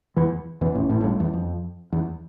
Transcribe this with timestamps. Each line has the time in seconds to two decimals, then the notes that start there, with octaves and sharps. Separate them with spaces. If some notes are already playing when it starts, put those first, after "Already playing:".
0.16 E2 E3
0.61 E2 E3
0.75 A1 A2
0.89 A1 A2
1.01 A2
1.04 G1 G2
1.20 E2
1.34 F2
1.92 E2